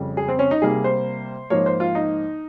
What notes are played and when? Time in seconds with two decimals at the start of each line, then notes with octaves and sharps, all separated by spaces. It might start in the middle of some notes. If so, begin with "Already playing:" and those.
Already playing: F2 C#3 G3
0.17 G#4
0.29 C4
0.39 C#4
0.51 D#4
0.62 C3 G3 A#3 G#4
0.84 C5
1.50 G#2 F3 A#3 C#5
1.66 C5
1.80 F4
1.95 D#4